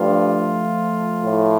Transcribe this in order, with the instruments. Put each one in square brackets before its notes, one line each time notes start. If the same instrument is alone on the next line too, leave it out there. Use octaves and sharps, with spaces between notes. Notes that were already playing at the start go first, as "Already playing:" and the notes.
Already playing: [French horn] G2 [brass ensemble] F3 A3 F4
[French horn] A2